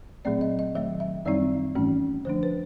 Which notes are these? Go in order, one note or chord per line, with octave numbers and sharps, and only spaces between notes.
A#2 F#3 A3 C4 D5
D#5
D#5
D#3 F#3 A3 E5
E5
F#2 D#3 G3 C4 D#4 D5
G#2 E3 A3 C#4
D3 F3 A3 D4 C5
B4